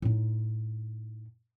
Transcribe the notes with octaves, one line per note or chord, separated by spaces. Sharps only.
A2 D#4